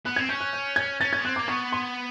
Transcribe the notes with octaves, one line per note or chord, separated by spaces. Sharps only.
B3 F#6
C4 G#6
C#4 G6
F#6
G6
G#6
C#4 A6
G#6
B3
C4 F#6
D6
A#3
B3 C#6
C6